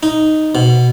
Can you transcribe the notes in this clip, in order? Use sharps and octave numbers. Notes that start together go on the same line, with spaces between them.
D#4
B2